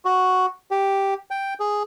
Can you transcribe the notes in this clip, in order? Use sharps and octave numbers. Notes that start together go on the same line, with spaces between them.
F#4
G4
G5
G#4